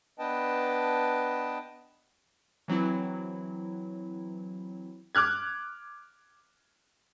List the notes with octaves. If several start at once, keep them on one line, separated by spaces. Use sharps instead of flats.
B3 D4 B4 D#5 G5 A5
E3 F#3 C4 E4
D6 F6 F#6 G#6